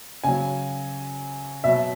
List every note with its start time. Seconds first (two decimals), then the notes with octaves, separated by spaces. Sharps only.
0.24 C#3 F#3 G#5
1.64 B2 F#3 E5